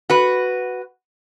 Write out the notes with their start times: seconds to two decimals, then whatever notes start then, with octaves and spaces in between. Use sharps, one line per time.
0.10 F#4 B4